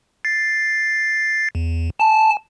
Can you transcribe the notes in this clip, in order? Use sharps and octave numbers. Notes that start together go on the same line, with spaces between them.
A6 C7
E2
G#5 A5